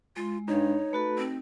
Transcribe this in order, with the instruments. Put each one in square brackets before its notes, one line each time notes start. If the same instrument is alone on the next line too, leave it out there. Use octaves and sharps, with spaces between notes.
[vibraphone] G#3 [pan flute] F4
[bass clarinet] G2 [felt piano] D#4 [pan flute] C#5
[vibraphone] A3 F#4 A4 [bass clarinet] B4
[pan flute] C4